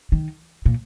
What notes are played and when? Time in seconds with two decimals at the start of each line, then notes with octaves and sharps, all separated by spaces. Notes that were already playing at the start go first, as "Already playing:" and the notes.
0.12 D#3
0.66 A#2